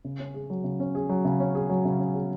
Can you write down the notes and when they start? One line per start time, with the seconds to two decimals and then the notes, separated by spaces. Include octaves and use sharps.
0.05 C#3
0.19 C#4
0.34 G#4
0.50 F#3
0.64 C#3
0.80 C#4
0.95 G#4
1.09 F#3
1.25 C#3
1.40 C#4
1.55 G#4
1.70 F#3
1.85 C#3
2.00 C#4
2.14 G#4